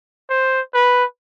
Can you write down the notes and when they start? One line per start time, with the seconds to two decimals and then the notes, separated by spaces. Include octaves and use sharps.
0.30 C5
0.74 B4